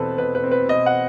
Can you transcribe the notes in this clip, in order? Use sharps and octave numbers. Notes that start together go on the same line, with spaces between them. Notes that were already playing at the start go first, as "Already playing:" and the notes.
Already playing: E2 B2 C4 A4 B4
B2 B4
B4
C4
B4
B2 D#5
F#5